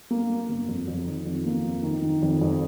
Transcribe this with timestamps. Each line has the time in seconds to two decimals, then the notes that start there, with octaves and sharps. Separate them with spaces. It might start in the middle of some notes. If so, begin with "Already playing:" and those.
0.11 A#3
0.30 A#3
0.49 G1
0.68 F2
0.88 F2
1.07 D#3
1.27 F2
1.46 A#3
1.64 F2
1.83 D#3
2.02 D#3
2.22 F2
2.41 F2